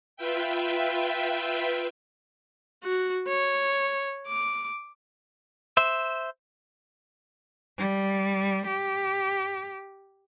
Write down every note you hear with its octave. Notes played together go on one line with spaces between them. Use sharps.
F4 B4 E5 G5
F#4
C#5
D6
C5 E5
G3
G4